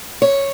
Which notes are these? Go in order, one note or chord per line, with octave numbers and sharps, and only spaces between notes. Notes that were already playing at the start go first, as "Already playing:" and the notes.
C#5